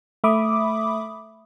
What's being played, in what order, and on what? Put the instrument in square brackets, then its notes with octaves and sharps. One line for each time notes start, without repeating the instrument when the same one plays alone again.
[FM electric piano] A3 E5 B5 D6 D#6